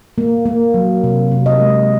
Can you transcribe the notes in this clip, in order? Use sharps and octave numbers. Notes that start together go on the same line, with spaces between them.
A#3
A#3
F#3
C3
C3
D#5
G#3